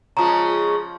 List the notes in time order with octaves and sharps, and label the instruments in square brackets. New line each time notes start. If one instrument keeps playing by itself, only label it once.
[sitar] C#3 G#3 [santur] F3 C#6 [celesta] A#5